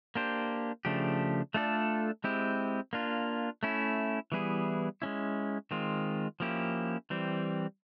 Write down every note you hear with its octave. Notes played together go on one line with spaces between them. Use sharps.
A#3 D4 G4 C5
C#3 F3 A3 D4 G4
A3 D4 F4 A4 D5
G#3 C4 E4 G4
A#3 D4 F4
A3 C#4 E4
E3 G3 B3 E4 G#4
G#3 C#4 E4
D#3 G#3 C4 F4
F3 A#3 C#4 E4 G4
E3 G3 C4